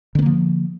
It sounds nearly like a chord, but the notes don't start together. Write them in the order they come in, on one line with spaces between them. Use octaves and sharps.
D3 B3 A#3 F3